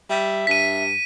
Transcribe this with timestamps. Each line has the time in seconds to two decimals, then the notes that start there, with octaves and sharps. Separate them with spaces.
0.10 G3 E5
0.47 G2 B6 D#7